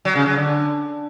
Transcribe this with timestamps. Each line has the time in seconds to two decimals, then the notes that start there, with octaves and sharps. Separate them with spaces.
0.05 F#3
0.15 C#3
0.26 F#3
0.36 D3